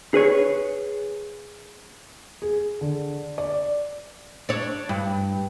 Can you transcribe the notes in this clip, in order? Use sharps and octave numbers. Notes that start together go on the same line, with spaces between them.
G#4 B4 C#5
G#4
D3
D5
D4 C#5
G2